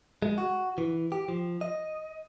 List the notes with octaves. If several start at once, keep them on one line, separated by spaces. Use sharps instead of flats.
G#3
F#4
E3
G4
F3
D#5